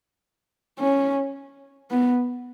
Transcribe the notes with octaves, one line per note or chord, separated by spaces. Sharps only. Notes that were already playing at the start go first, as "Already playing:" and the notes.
C#4
B3